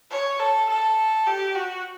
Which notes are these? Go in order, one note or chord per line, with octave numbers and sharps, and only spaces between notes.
C#5
A4
A4
G4
F#4